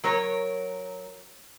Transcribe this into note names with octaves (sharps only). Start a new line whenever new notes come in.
F#3 A#4 C#5